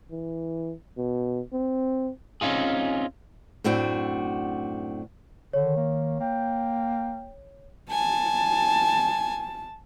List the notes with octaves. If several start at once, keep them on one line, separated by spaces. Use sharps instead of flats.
E3
B2
C4
C4 C#4 D#4 F4 G#4
F#2 A2 C4 D4 F#4
D3 D#3 C#5
A#3
A#3 G5
G#5 A5